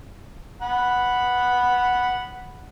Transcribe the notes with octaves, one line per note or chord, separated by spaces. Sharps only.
F#5 B5